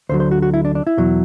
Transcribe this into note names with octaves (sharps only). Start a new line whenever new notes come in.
D2 D3 F#3 C5
C5
F#4
F#4
E4
D4
D4
E4
E2 B2 F#3